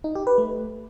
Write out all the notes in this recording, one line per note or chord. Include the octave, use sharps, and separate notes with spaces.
D#4
G4
B4
A3